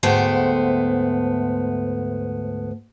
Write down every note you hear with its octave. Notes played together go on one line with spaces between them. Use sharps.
D2 G#2 A3 B3 C5 G5